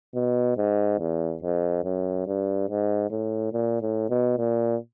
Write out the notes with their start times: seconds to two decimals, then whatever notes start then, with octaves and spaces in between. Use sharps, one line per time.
0.15 B2
0.57 G#2
0.99 E2
1.42 F2
1.84 F#2
2.27 G2
2.69 G#2
3.10 A2
3.53 A#2
3.81 A2
4.10 B2
4.38 A#2